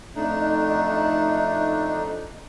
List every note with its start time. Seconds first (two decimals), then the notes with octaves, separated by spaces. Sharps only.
0.15 F2 A3 D4 D#4